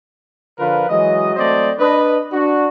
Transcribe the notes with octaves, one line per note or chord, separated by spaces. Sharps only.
D3 F3 F4 A#4 B4
E3 F#3 G#3 D#5
F#3 A3 C4 C5 D5 D#5
D4 B4 D#5
D4 F#4